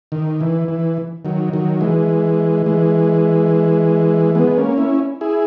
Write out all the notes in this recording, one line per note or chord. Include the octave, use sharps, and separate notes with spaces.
D#3
E3
E3
D#3 F#3
D#3 F#3
E3 G#3
E3 G#3
G#3 B3
A#3 C#4
C#4 E4
E4 G#4